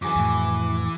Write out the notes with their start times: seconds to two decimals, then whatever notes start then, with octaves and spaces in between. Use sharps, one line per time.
0.02 F#2 E3 F#4 G#4 B4 D6
0.16 F2 A2 E3